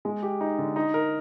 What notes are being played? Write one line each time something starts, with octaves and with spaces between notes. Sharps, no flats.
G#3
G4
D#4
D3
D#4
A#4